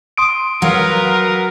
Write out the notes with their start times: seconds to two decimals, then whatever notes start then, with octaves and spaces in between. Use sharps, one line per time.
0.18 C6 D#6 D7
0.62 F#3 A#4 B4 F5